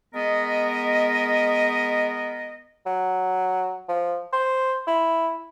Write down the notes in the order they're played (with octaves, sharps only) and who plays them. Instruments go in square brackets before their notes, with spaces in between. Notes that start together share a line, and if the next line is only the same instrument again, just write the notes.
[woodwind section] G#3 B3 A#4 D#5
[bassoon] F#3
F3
C5
E4